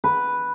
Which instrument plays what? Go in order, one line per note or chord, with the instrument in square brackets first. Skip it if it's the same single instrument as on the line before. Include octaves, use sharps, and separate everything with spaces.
[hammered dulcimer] B4